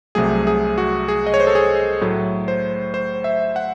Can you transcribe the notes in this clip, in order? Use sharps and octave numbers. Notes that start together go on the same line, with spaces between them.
C2 C3 F#3 A3 G#4
G#4
F#4
G#4
D#5
C#5
C5
A4
G#4
A2 F#3 A3
C5
C5
E5
F#5